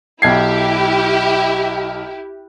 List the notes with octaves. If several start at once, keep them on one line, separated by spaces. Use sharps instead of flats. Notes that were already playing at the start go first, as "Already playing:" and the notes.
B1 E4 G4 G#6 C7